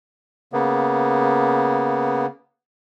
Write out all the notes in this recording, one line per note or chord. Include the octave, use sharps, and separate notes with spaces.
C#3 A#3 B3